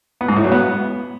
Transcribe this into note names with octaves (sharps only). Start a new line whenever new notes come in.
B3
G#2
A2
F#3
B3